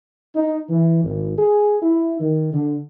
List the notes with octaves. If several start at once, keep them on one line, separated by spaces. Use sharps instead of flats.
D#4
E3
G#1
G#4
E4
D#3
D3